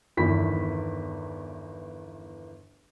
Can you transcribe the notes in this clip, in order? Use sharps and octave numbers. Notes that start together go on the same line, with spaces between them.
G1 E2 D#3 E3 B5 B6